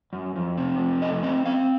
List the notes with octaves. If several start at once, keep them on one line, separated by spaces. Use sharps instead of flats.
F#2
F2
C3
F2
A3 D#5
C4 D#5
C4 F5